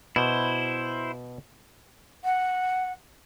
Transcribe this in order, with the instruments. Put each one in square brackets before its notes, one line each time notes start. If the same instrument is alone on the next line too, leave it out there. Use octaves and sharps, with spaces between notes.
[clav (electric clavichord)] B2 [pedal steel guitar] E4 C5
[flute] F#5